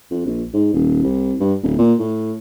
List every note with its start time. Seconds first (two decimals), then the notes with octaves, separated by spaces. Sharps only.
0.11 F2
0.26 A#1
0.53 G#2
0.73 D#1
1.03 C2
1.40 G2
1.63 D1
1.78 A#2
1.99 A2